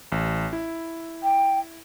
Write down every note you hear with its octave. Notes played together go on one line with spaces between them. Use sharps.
A1
E4
G5